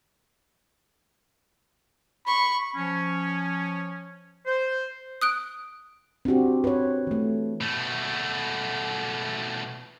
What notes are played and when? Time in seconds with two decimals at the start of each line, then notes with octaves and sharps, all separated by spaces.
2.27 B5 C#6
2.75 F3 C#4
4.46 C5
5.21 D#6 F#6 D7
6.25 C4 D4 F#4 G4
6.64 B4 C#5
7.07 E3 A3
7.61 B2 A3